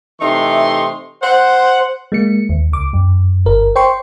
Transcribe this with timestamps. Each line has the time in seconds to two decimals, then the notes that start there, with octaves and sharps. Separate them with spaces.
0.20 C3 E3 A3 D#4 C6
1.23 C5 F#5
2.12 G#3 A#3 C#7
2.49 D#2
2.72 C#2 D6
2.93 F#2
3.45 G1 A#4
3.76 C5 G5 C6 C#6